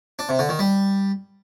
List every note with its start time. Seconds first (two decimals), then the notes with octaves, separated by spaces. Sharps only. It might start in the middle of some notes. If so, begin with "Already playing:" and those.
0.19 D4
0.29 C3
0.39 D3
0.49 D#3
0.59 G3